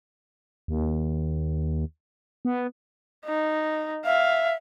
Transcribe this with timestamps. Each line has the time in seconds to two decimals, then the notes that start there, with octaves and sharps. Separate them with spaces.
0.68 D#2
2.45 B3
3.26 D#4
4.05 E5 F5